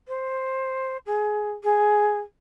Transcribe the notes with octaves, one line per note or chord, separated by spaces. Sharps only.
C5
G#4
G#4